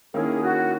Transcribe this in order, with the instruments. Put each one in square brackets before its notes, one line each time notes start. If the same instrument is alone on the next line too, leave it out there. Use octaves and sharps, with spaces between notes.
[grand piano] D#3 A#3 C#4 E4 [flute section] G#4
[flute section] F#4